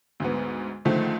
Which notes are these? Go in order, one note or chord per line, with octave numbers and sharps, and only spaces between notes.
D2 G#2 B3
C#2 D3 D#3 F3 A3